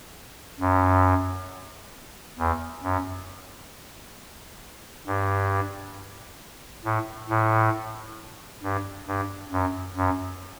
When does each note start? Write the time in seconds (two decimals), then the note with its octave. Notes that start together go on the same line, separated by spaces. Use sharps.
0.60 F#2
2.38 E2
2.84 F#2
5.07 G2
6.85 A2
7.29 A2
8.63 G2
9.07 G2
9.52 F#2
9.96 F#2